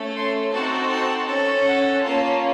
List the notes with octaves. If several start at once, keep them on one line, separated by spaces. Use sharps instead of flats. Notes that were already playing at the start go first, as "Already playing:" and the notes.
Already playing: A3 C#4 A4
C6
C4 D#4 F#4 A4 A5
A5
C#4 A4
F#5
A#3 C#4 F4 A5